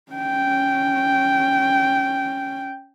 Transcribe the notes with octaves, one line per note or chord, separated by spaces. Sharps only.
C#4 G5